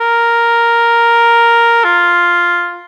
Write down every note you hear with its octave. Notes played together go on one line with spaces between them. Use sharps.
A#4
F4